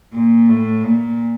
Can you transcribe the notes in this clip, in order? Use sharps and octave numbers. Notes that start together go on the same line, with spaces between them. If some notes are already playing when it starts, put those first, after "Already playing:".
A#2
A2
A#2